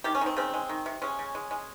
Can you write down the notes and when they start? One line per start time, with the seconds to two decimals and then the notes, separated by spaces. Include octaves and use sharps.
0.04 D#3 G4
0.15 C#4
0.21 D#3 C4
0.37 C#3 C4
0.54 G#3
0.69 D#3
0.86 C3
1.02 G#3 C#4
1.19 C#3
1.35 G#3
1.51 G#3